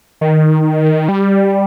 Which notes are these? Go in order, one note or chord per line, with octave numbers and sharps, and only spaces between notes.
D#3
G3